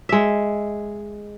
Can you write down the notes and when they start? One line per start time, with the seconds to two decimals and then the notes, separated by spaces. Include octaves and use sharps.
0.09 G#3 E5